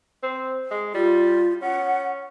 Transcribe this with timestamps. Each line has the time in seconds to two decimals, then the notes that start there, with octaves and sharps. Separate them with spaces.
0.23 C4
0.71 G#3
0.95 G3 F4
1.62 C#4 F#5